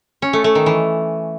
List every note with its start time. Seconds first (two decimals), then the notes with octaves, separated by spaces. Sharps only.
0.22 C#4
0.33 A3
0.44 A3
0.55 D#3
0.66 E3